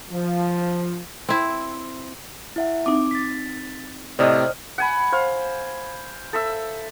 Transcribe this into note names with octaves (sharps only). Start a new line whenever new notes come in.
F3
C4 E4
E4 E5 F#5
C4 D#4 D6
A6 B6
A2 C3 C5 D5 D#5 G5 D#6 F6
F#5 G#5 B5
C5 F5
A4 E5 E6